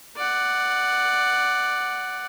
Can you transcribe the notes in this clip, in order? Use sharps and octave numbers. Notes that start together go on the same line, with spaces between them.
D5 F#5